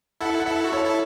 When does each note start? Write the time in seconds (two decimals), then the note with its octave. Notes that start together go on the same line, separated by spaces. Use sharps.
0.21 E4 A4 F#5
0.40 F#5
0.46 E4 A4 E5
0.64 F#4
0.73 E4 A4 C#5
0.85 E4 A4